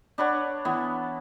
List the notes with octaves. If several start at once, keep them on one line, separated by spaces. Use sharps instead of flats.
D4 B4 C#5 F#5
E3 B3